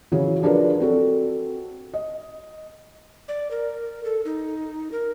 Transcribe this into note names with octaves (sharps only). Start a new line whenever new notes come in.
C#3 E3 F#3 G#4
F3 D4 G#4 A#4 B4 D5
C4 F#4 A4
D#5
D5
A#4
A4
D#4
A#4